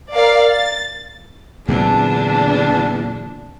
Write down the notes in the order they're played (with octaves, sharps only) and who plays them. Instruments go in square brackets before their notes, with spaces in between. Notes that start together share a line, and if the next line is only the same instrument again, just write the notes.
[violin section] A#4 D5 F5
A6
[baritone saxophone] E2 [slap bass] A#2 F#3 C4 [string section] D3 D4